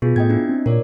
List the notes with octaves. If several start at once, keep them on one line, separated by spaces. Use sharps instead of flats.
B2 B3 F4 G#4
A2 D#5 G5 G#6
D4 E4
C4
A#2 A#4 C#5 D5